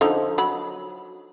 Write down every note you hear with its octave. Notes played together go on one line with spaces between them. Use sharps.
D3 F3 D#4
F#3 B5